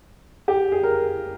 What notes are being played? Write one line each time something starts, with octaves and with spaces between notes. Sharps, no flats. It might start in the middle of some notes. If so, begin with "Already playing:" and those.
G4
G#4
A#4